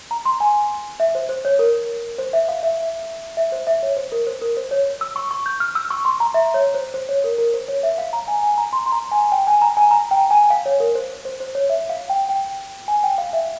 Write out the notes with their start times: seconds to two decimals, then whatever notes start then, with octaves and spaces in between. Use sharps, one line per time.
0.11 A#5
0.25 C6
0.40 G#5
1.00 E5
1.15 C5
1.29 C5
1.45 C#5
1.59 A#4
2.18 C5
2.33 E5
2.49 F5
2.63 E5
3.37 E5
3.52 C5
3.67 E5
3.83 C#5
3.97 C5
4.12 A#4
4.27 C5
4.41 A#4
4.57 C5
4.71 C#5
5.01 E6
5.16 C#6
5.31 C#6
5.46 G6
5.60 F6
5.75 E6
5.91 C#6
6.05 C6
6.20 A#5
6.34 E5
6.54 C#5
6.74 C5
6.94 C5
7.09 C#5
7.24 A#4
7.38 A#4
7.54 C5
7.68 C#5
7.83 E5
7.98 F5
8.13 A#5
8.28 G#5
8.43 G#5
8.58 A#5
8.73 C6
8.86 C6
8.92 A#5
9.12 G#5
9.32 G5
9.47 G#5
9.62 A#5
9.77 G#5
9.91 A#5
10.11 G5
10.31 G#5
10.50 F5
10.66 C#5
10.80 A#4
10.95 C5
11.25 C5
11.40 C5
11.55 C#5
11.70 E5
11.89 F5
12.09 G5
12.29 G5
12.88 G#5
13.03 G5
13.18 F5
13.33 E5